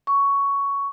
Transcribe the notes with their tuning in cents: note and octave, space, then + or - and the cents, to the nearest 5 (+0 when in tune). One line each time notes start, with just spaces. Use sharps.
C#6 +10